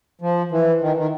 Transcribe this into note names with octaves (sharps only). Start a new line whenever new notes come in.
F3
E3
D#3
D#3